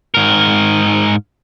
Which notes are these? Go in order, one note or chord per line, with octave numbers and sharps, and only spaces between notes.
G#2 A#4